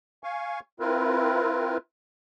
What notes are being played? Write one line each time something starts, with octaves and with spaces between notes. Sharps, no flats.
F5 G#5 C#6
C4 E4 F4 A#4 B4